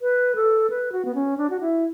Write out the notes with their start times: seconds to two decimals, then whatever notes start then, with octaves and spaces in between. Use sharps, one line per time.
0.02 B4
0.35 A4
0.70 B4
0.92 F#4
1.05 B3
1.15 C#4
1.38 D4
1.50 F#4
1.61 E4